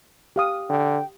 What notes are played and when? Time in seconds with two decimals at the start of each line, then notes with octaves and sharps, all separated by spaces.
0.36 G4 F5 D#6
0.69 D3 G5